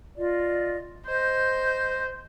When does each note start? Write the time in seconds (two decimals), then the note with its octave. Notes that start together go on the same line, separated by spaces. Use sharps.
0.17 F4 D5 D#5
1.06 C5 D#5 G6